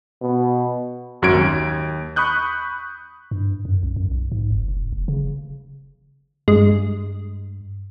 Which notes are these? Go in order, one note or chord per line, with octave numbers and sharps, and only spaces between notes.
B2
G#1 F#2 F#4 G#6 D7
D#2
B5 C#6 D#6 F#6 G6
G2
F#2
B1
F#2
B1
G#2
F#1
F1
F#1
C#3
G2 G#3